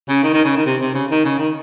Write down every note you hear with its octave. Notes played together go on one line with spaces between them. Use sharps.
C#3
D#3
D#3
C#3
D#3
C3
C3
C#3
D#3
C#3
D#3